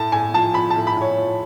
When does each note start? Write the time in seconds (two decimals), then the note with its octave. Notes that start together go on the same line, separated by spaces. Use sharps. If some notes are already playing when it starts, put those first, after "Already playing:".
Already playing: A2 A5
0.12 A2 G#5
0.34 F3 A5
0.54 F3 B5
0.70 A5
0.76 A2
0.87 B5
0.97 A2 C#5
1.18 F3